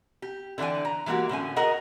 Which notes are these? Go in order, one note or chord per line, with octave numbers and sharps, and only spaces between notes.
G4
D3 E3 D4 G5 G#5
A#5
E3 G#3 A#3 F#4 G4
A2 D3 C#4 G#5
F#4 G#4 A#4 D#5 F#5 A#5